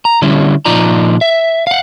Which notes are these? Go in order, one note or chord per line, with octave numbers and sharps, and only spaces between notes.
A#5
D3 G3 C#4 E4
A#2 F3 D#4 F4 D5 A#5
E5
F5 F#5